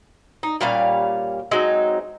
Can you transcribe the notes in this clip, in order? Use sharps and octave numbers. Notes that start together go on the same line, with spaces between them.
D#4
A#2 G3 C#4 F5
F#3 G#3 C4 D#4